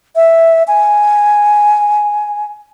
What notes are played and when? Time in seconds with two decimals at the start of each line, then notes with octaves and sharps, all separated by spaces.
0.16 E5
0.68 G#5